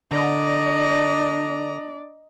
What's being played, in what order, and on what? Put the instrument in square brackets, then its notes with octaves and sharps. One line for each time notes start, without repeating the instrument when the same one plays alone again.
[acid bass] D3 [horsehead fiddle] D4 D5 [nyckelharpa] D#5 A#5